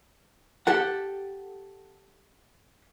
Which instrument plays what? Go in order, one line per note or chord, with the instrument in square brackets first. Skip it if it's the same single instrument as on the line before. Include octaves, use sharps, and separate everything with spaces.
[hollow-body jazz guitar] G4 A4 F#5